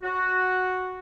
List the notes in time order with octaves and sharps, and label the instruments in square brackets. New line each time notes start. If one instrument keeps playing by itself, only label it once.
[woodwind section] F#4